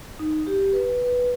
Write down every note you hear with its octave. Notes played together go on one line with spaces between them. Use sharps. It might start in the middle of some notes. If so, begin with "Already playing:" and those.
D#4
G4
B4
B4